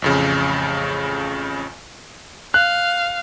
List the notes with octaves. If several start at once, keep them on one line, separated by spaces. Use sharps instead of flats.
A1 F2 C#3
F5 F#6